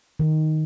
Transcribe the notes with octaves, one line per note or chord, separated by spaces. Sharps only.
D#3